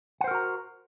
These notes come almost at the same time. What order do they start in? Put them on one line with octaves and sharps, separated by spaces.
F#5 C5 A#4 F#4 A#5